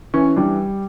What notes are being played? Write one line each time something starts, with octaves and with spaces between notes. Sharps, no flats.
E3 C#4
G3 D4